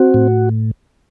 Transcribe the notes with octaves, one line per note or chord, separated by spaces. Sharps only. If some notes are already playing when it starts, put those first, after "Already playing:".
Already playing: C4 F#4
A2